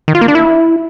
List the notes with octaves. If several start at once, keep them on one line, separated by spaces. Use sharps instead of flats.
D#3
F4
A#3
D4
E4